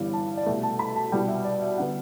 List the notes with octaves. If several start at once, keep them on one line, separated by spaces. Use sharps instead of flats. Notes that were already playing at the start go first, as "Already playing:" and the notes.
Already playing: G1 G2 E3 G3 B3
A5
D5
C2 B2 A3 E5
A5
B5
A5
C2 B2 G3 G5
E5
D5
E5
D3 G3 B3 F#5